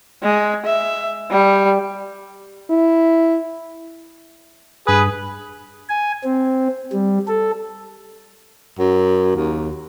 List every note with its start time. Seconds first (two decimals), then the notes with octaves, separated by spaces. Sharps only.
0.23 G#3
0.66 E5
1.31 G3
2.70 E4
4.87 G2 G#4 B4 D#6
5.89 G#5
6.24 C4
6.92 G3
7.28 A4
8.79 F#2
9.36 D#2